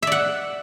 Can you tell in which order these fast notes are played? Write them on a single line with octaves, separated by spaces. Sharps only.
E5 D5 F#5